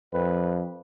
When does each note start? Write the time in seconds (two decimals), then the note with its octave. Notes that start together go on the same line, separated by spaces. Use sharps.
0.13 F2 B4